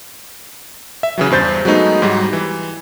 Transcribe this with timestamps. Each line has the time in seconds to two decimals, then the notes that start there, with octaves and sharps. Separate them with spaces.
1.03 E5
1.18 C#3 E3 F#3
1.30 E2 G2 C5 G6 A6
1.65 F#3 G#3 A3 B3 D#4
2.02 G#2 F#3 G3
2.33 E3